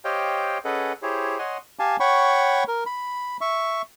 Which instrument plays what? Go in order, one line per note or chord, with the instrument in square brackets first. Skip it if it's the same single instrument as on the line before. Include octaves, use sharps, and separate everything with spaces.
[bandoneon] G4 C5 C#5 D#5 F5 G5
C#4 G#4 A4 B4 D#5 F#5
E4 G4 G#4 C5 C#5
C#5 D#5 F#5 G#5 C6
[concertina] G4 F5 G#5 A5
C#5 F#5 G5 B5 C#6
A#4
B5
E5 C#6